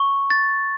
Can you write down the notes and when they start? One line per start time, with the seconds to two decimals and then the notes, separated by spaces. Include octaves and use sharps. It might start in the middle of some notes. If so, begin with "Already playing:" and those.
Already playing: C#6
0.30 A6